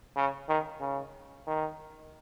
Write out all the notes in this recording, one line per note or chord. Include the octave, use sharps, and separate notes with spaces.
C#3
D#3
C#3
D#3